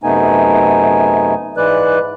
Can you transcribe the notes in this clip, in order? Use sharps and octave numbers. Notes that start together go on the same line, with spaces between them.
F#2 C3 A3 B3 D#4 G#5
G#2 E3 G#3 B4 D5 F#6